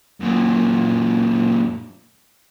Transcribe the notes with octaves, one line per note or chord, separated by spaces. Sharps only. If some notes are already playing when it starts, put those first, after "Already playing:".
F#2 A#2